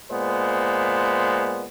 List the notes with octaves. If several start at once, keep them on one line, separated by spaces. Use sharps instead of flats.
A#2 G#3 B3 C5